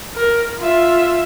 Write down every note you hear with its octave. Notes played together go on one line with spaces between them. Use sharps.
A#4
F4 E5